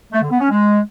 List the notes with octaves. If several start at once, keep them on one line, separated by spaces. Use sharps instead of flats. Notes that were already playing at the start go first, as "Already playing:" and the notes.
A3
D3
B3
C#4
G#3